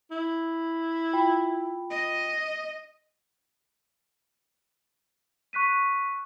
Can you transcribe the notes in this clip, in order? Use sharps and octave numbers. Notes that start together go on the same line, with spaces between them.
E4
F4 G5 B5
D#5
C#6 F#6 B6 D#7